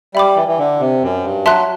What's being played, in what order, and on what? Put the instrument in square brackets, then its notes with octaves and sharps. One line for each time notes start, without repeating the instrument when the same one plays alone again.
[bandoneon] G3 [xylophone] E5 B5 D6
[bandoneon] E3
E3
D3
C3
F#2
G2
[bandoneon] F#3 [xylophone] E5 A5 C6 F#6